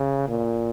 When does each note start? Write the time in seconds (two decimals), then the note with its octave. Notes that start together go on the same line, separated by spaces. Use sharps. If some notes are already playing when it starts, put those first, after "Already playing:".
Already playing: C#3
0.28 A#2